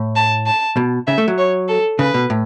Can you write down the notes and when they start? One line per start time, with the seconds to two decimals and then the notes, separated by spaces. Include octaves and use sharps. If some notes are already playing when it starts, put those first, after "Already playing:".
Already playing: A2
0.16 A5
0.46 A5
0.77 B2
1.07 C#3 E5
1.18 A3
1.28 F#3
1.38 C#5
1.68 A4
1.99 C#3 B4
2.14 B2
2.30 A2